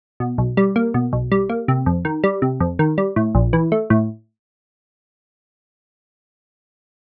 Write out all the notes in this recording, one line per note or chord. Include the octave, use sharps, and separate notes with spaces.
B2
B1
G3
A#3
B2
B1
G3
A#3
C3
F2
D#3
G3
C3
F2
D#3
G3
A2
A#1
E3
A3
A2